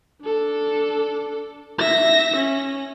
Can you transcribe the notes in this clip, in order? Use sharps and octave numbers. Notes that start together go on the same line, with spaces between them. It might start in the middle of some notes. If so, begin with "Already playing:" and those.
D4 A4
E5 A#6
C#4